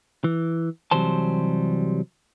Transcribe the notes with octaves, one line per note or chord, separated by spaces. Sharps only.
E3
C3 E3 F#3 G3 C5 A5